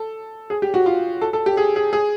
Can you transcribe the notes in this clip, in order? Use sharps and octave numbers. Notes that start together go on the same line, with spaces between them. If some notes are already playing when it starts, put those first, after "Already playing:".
Already playing: A4
G#4
G4
F#4
F4
A4
A4
G4
G#4
G#4
G#4